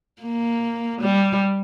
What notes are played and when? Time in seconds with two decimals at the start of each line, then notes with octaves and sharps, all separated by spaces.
0.22 A#3
1.01 G3